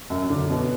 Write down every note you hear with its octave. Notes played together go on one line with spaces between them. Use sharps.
F#2
D3
B2